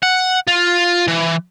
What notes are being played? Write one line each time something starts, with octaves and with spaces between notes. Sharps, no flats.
F#5
F4
E3